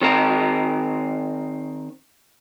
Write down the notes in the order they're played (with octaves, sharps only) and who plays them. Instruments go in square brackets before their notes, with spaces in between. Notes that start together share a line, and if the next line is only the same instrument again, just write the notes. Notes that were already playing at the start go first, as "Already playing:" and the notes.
[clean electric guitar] D#3 C4 A#4